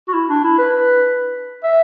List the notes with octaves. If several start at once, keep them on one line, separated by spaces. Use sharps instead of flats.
F#4
E4
D4
E4
B4
E5